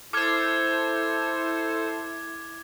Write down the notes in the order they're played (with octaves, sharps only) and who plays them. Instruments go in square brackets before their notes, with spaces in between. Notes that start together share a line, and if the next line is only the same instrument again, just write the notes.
[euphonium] E4 [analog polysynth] A4 C5 [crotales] D6 F6 G#6